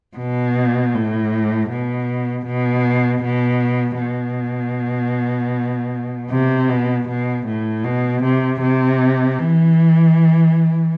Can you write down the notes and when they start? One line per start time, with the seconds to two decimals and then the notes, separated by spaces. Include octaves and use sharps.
0.17 B2
0.94 A2
1.71 B2
2.47 B2
3.24 B2
4.01 B2
6.31 C3
6.68 B2
7.08 B2
7.46 A2
7.84 B2
8.23 C3
8.61 C3
9.38 E3